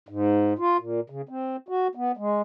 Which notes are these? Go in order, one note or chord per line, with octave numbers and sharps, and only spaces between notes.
G#2
F4
A#2
C#3
C4
F#4
B3
G#3